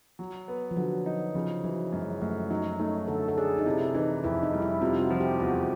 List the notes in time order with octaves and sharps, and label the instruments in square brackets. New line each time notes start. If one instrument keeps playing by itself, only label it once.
[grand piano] F#3
B3
[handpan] F3
[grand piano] D3 [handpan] F#3
[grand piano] D#4
[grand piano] C#3 [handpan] F3
[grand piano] E3 [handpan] F#3
[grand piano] F#2 [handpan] G#3
[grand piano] F#2 [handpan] A3
[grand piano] F#3 [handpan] D#4
[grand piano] A3 [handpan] D#4
[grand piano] D3 [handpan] A4
[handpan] A4
[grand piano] D4 [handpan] G#4
[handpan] D#4
[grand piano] C3 [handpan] E4
[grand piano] E3 [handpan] D#4
[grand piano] F2 [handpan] E4
[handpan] D#4
[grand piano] G3
[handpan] E4
[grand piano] C3 [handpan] F4
[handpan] F#4
[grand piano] F3
[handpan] G4
[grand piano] E2 [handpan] F#4